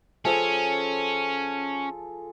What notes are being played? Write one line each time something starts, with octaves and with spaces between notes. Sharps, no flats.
F3 C#4 G#4 A4